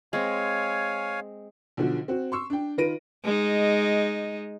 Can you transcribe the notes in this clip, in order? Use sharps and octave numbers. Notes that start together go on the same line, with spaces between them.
G#3 C4 C#5 F5 G#5
B1 D3 F3 F#4
C4 F#4
C6 C#6 E6
D4 G5
D#3 F4 B4 A#6 D7 D#7
G#3 D#4